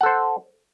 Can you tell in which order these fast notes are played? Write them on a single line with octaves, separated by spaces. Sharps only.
F#5 A4 C5